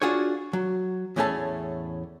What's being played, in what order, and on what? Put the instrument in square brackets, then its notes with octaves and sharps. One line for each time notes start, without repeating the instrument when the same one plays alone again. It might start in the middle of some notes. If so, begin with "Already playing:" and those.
[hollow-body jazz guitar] D4 F4 F#4 G#4 C#5
F#3
E2 A2 A3 C#4 G#4 A5